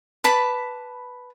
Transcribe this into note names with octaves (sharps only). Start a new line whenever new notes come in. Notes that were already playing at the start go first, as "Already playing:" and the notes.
B4 A5 B5 D6